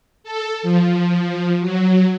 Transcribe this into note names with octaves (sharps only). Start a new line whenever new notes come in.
A4
F3
F#3